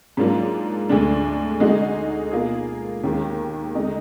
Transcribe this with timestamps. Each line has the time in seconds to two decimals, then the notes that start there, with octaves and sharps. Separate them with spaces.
0.17 G#2 F#3 A#3 D4 F4
0.89 D2 D3 G#3 D4
1.60 D3 G#3 D#4 F#4
2.31 B2 A#3 F4 G#4
3.03 D#2 D#3 G#3
3.75 D3 G#3 D#4